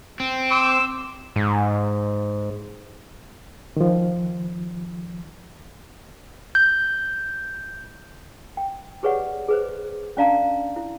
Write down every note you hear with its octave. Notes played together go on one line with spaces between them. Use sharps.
C4
C5 D6 E6
G#2
D#3 F3
G6
G5
G4 G#4 B4 C#5 D5 F#5
G#4 B4 C5
C#4 D4 D5 F5 A5 A#5
E4